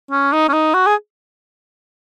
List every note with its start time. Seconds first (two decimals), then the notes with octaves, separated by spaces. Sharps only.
0.11 C#4
0.32 D#4
0.48 C#4
0.53 D#4
0.74 F#4
0.86 G#4